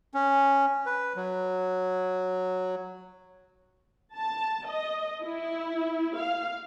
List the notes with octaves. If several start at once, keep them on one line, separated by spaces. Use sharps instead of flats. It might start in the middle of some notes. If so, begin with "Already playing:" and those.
C#4
B4
F#3
A5
D#5
E4
F5